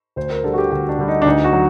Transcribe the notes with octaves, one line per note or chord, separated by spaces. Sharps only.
D2 C5
A#4
D3 G3 A4
F#4
G4
D2 F#4
D4
D3 G3
D#4
D4
D2 D#4
F#4
F#3